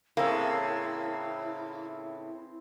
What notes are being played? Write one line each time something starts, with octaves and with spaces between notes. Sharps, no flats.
A2 C#3 E3 A#3 C4 E4